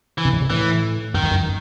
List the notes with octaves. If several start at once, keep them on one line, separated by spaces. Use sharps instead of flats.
E3
C3
G#2
C3
A2 E3
F#2 D#3
E2
F#2